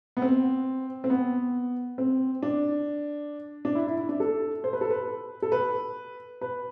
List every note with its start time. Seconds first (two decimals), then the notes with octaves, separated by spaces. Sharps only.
0.17 B3
0.22 C4
1.04 C4
1.10 B3
1.98 C4
2.43 D4
3.65 D4
3.75 E4
3.87 E4
3.97 E4
4.09 D4
4.20 A4
4.64 C5
4.73 B4
4.81 A4
4.90 B4
5.42 A4
5.52 B4
6.41 B4